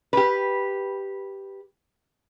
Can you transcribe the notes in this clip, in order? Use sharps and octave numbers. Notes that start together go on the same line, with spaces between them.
G4 B4